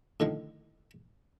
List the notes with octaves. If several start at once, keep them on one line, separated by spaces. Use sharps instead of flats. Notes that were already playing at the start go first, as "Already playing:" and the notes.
A2 D3 D#3 F3